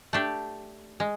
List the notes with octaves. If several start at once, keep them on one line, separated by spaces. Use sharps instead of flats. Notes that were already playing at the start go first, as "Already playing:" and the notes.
A3 D4 G4
G#3